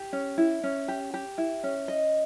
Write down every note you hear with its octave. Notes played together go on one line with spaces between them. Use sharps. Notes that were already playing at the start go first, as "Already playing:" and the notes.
Already playing: G4
C#4
E4
C#4
G4
G4
E4
C#4
D#5